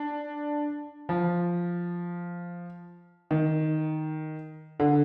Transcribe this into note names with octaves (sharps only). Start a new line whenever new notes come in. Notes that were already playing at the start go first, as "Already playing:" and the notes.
Already playing: D4
F3
D#3
D3